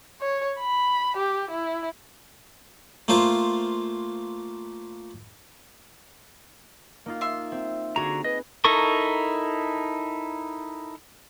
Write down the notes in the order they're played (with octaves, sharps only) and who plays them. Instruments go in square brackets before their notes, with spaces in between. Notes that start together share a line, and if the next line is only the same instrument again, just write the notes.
[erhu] C#5
B5
G4
E4
[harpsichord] A3 A#3 F4 C5 A5
[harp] A#3 D#4 F4
[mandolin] E5 C6
[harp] C4
[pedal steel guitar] D3 F#4 A#5 [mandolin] G#4
[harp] B4 [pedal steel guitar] D#5
[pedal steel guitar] D#4 E4 A4 A#4 C#6